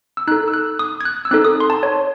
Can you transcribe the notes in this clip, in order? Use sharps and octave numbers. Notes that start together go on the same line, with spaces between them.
E6
D#4 A4 F#6
E6
F#6
D#6
G#6
F#6
E6
C4 D#4 A4 F#6
D#6
C6
A5
C#5